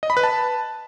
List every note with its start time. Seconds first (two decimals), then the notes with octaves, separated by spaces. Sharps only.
0.03 D#5
0.10 B5
0.17 B4
0.23 A5